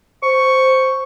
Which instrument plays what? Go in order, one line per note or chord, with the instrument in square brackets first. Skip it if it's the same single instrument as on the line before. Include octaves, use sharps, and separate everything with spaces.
[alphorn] C5 [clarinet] C#6